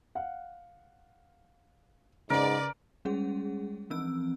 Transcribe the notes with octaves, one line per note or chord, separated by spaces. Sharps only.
F5 F#5
G#2 C#3 A#4 B4 D5
G3 G#3 C#4 G#4 F#5
E3 F3 C4 E6